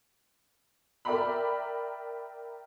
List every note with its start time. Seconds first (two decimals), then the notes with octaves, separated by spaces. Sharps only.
1.05 A#4 D5 E5 G5 A#5 B5